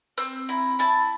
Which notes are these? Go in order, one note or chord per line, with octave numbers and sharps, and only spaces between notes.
C4 E6
E4 A#5
E4 A5